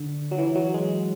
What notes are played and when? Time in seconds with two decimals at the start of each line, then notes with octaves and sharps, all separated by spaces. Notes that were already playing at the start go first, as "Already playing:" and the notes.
Already playing: D3
0.31 F#3
0.38 E3
0.55 F#3
0.74 G#3